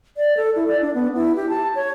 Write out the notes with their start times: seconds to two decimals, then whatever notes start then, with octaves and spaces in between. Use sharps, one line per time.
0.17 D5
0.37 A4
0.56 E4
0.68 D5
0.81 D4
0.94 B3
1.15 E4
1.36 G4
1.49 A5
1.75 C#5